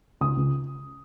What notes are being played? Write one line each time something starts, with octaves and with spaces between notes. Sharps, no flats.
C#2 D#6
C#2